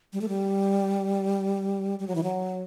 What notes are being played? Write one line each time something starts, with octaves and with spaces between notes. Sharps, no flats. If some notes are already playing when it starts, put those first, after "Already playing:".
G3
A3
G3
G3
F#3
E3
F#3